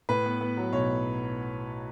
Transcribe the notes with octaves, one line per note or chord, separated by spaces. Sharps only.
A2 B4
B3
B3
F#3
B1 C#5